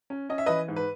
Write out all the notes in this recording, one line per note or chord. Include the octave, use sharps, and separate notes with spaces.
C#4
C#4 D#5
E5
E3 B4 D#5
G#2
B4